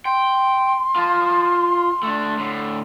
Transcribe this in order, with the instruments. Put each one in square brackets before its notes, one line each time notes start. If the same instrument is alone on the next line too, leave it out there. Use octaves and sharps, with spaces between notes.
[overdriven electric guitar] G5 [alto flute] C6
[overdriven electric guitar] F4 A5
A3 D4
A2 D3